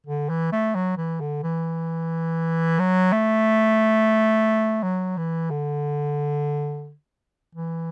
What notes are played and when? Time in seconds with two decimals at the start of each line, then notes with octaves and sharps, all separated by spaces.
0.07 D3
0.29 E3
0.52 A3
0.75 F#3
0.97 E3
1.21 D3
1.43 E3
2.79 F#3
3.12 A3
4.83 F#3
5.17 E3
5.51 D3
7.55 E3